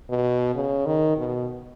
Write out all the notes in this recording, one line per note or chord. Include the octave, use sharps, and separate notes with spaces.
B2
C#3
D#3
B2